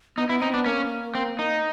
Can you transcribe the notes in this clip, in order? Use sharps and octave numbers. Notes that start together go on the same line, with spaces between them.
B3 D#4
B3 E4
C4 D#4
B3 D4
A#3 C#4
C4
D#4